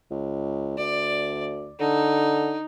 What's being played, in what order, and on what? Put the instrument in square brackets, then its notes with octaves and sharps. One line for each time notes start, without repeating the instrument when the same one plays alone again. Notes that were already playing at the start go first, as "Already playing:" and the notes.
[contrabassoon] C#2
[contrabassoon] D2 [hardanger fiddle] D5
[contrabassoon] D3 [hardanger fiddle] D#4